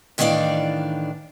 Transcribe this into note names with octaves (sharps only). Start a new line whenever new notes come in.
A2 D#3 E3 D4 D5 F5